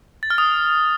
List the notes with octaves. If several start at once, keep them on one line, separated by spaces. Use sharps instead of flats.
A6
F6
D#6